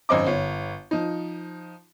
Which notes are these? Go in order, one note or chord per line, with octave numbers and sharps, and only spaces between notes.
G#1 F#2 C5 D#5 D6
G1 C#5
F3 D#4